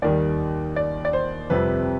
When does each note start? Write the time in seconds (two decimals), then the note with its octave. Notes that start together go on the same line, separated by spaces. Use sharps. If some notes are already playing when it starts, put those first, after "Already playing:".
0.02 D#2 D#3 G3 D5
0.76 D5
1.05 D5
1.13 C5
1.50 F2 C3 G3 C4 B4